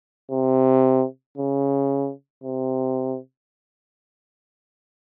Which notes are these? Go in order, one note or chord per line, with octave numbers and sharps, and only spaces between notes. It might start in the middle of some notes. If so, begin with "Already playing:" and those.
C3
C#3
C3